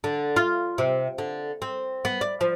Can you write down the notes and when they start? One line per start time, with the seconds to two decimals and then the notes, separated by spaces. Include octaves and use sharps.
0.04 D3
0.36 F4
0.78 C3
1.18 D3
1.62 C4
2.05 B3
2.21 D5
2.41 F3